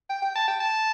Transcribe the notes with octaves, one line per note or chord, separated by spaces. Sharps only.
G5
G5
A5
G5
A5